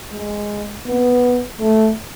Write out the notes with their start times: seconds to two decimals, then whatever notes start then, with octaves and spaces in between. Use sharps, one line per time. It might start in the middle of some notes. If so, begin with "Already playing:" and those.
0.12 G#3
0.86 B3
1.60 A3